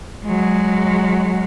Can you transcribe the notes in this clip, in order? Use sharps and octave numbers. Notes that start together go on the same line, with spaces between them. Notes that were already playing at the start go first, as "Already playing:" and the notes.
F#3 G#3